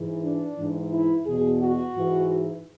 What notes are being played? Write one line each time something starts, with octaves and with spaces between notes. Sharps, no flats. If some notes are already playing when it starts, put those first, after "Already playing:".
Already playing: G#2 E3
D4
G#2 E3
E4
E2 B2 G#4
F#4
G#2 E3